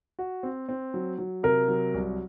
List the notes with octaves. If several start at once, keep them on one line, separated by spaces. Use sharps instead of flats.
F#4
C4
C4
F#3
F#3
C3 A#4
F#3
C2